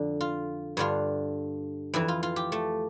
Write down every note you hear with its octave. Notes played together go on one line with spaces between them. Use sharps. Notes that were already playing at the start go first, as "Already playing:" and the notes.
Already playing: F2 D3
F4
G2 D3 F4
F2 E3 E4
F4
F4
G4
A3